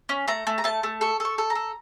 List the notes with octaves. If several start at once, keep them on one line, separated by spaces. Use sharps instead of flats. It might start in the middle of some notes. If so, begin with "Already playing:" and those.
C#4
A3 A#5
A3
A#5
A3 A5
A3
A4 C#6
A4 C#6
A4
A#5
A4